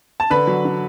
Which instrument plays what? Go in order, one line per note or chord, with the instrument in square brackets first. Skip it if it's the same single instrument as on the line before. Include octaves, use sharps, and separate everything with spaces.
[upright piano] A5
D3 B4 B5
F#3
D3